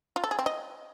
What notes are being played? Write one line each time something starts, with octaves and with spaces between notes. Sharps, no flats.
F4
A4
G#4
C4
D#5